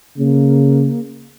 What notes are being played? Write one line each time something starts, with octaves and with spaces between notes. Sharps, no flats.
C#3 A#3